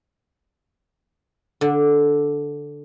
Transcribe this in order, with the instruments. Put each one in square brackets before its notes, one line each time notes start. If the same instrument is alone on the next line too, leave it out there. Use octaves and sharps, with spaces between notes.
[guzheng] D3